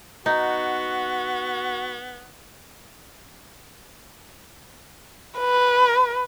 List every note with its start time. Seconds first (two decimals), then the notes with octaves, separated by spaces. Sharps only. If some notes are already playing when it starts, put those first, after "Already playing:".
0.26 B3 D#4 F#4
5.39 B4